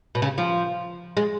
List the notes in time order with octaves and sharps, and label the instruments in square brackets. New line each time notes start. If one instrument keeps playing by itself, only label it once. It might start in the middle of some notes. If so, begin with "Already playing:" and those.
[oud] B2
C#3
F3
G#3